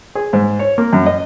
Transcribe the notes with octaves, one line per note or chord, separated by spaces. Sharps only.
G#4
G#2
C#5
A#3
F#2
D#5